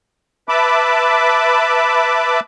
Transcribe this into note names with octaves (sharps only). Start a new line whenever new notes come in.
B4 E5 A5 B5 D6